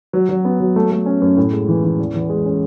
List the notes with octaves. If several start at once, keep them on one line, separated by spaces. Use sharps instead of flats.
F#3
F#3
B3
F#3
A3
A3
C#4
F#2
A2
G#3
E3
E3
E2
E2
G#3
C#4